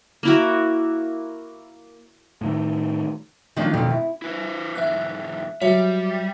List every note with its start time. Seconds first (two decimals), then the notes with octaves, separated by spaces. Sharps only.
0.23 A#3 E4 F#4
2.41 A2 D#3
3.56 D#3 F3 F#3 A#3 C#4 D4
3.74 F2 B2 D#3
3.90 E4
4.22 E4 B4 C5
4.75 E2 G#2 E3 E5 F#6
5.61 F#3 G3 C#5 E5 C#7